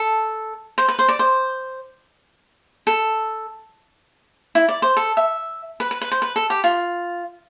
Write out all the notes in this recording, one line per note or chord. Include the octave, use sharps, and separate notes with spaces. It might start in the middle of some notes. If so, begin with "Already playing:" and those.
Already playing: A4
C5
B4
C5
D5
C5
A4
E4
D5
C5
A4
E5
B4
B4
B4
C5
B4
A4
G4
F4